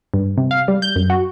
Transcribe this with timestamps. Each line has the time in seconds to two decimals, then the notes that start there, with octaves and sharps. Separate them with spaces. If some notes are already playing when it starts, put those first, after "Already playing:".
0.14 G2
0.38 C3
0.51 F5
0.68 G3
0.82 G6
0.96 F#2
1.10 F#4